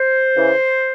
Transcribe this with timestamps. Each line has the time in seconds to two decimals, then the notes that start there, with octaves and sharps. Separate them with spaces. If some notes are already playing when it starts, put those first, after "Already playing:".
Already playing: C5
0.35 C#3 E3